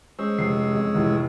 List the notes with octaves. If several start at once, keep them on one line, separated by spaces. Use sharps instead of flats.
G#3 C#4 C5 E6
F1 C7
F2
F1 A2 E3